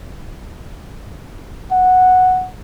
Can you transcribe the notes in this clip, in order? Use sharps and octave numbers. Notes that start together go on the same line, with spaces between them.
F#5